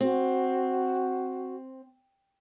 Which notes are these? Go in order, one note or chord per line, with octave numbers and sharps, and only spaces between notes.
C4 F#4